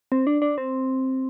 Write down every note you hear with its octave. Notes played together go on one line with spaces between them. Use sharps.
C4
D4
D4
C4